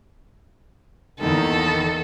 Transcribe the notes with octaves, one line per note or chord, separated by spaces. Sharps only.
E2 D#3 A#3 D#4 A4